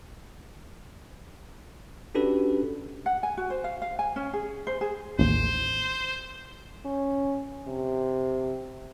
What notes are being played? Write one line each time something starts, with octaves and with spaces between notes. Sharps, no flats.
C#4 D4 F#4 G4 A4 B4
F#5
G#5
F#4
C5
F5
F5
G#5
C#4
G#4
C5
G#4
A1 D#2 C5
C#4
C3